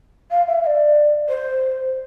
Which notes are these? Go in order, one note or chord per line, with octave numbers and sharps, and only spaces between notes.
F5
E5
E5
D5
C5